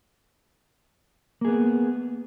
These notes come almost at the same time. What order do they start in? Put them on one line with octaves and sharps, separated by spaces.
A#3 G#4 B3